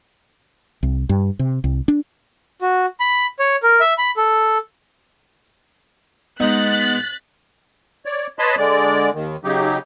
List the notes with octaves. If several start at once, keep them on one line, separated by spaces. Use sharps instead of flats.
C2
G2
C3
C2
D4
F#4
B5
C#5
A#4
E5
B5
A4
G#3 B3 D#4 F#6 A6 B6
C#5 D5
B4 C#5 D#5 A5 B5 C6
D3 G#3 D5
D#2 D#3
C#3 F#3 D#4 G4